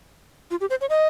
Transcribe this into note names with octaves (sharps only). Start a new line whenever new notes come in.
F4
G4
C5
C#5
D#5